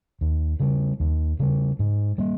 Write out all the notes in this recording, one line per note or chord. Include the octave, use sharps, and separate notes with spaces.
D#2
C#3 G3
D#2
C#3 G3
G#2
G3 A#3